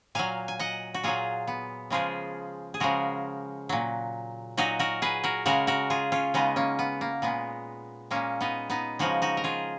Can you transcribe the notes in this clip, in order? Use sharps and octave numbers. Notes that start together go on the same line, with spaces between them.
A#2 F#3 F5 G#5
G#5
D#5 F#5
F#4
A#2 F#3 F4 G#4
B3
C#3 F3 G#3 F4 G#4
G#4
C#3 F3 G#3 F#4 A#4
A#2 F#3
A#2 F#3 D#4 F#4
F#4 A#4
G#4 B4
F#4 A#4
C#3 G#3 F#4 A#4
F#4 A#4
F4 G#4
C#4 F4
C#3 G#3 B3 D#4
A#3 C#4
B3
A#3
A#2 G#3 B3
A#2 G#3 A#3 C#4
B3 D#4
B3 D#4
C#3 F3 G#3 D#4 F#4
D#4 F#4
A#4
F4 G#4